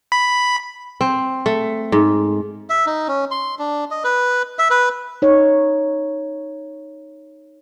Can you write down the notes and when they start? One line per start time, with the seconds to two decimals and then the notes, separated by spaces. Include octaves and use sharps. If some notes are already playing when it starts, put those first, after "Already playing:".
0.12 B5
1.01 C4
1.46 A3
1.92 G#2
2.70 E5
2.86 D#4
3.08 C#4
3.31 C6
3.59 D4
3.91 D#5
4.04 B4
4.59 E5
4.71 B4
5.22 D#4 C#5